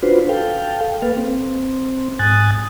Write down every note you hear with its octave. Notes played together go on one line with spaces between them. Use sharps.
D4 F4 F#4 B4 C5
A4 F5 G5
A#3 A4 B4 F5
C4
G#2 G#5 D#6 F#6 A6